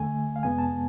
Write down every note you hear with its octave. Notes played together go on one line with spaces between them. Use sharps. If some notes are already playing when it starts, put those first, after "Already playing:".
Already playing: D2 D3 A3 G#5
F5
F2 C3 G#3 B3 G#5
A5